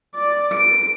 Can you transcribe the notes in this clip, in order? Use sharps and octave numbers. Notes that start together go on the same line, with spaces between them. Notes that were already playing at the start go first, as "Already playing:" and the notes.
D5
D7